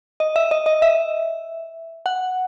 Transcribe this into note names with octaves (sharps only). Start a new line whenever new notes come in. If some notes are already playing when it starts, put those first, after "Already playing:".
D#5
E5
D#5
D#5
E5
F#5